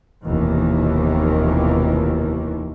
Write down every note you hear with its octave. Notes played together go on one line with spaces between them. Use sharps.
F1 D#2 B2 D#3 E3